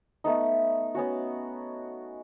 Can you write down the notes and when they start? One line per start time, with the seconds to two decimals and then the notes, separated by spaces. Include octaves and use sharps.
0.24 A3 B3 D#4
0.95 B3 C#4 F#4